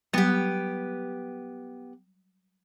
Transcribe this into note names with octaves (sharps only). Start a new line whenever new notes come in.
F#3 G3 B3 G4